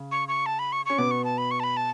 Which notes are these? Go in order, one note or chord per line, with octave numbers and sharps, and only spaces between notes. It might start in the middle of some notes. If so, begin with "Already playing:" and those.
Already playing: C#3
C#6
C#6
A5
B5
C#6
C#4 C#6
B2 B3 D6
C#6
A5
B5
C#6
A5
B5
A5